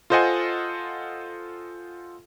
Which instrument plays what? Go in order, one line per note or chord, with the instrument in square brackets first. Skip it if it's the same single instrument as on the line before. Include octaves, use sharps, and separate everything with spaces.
[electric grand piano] F4 A4 C5 D#5 F#5 G#5